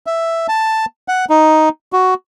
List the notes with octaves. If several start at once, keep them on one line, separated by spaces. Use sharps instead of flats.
E5
A5
F#5
D#4
F#4